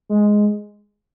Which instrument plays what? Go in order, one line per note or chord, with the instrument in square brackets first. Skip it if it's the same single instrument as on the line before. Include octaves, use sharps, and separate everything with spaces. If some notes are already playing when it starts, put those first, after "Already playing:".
[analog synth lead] G#3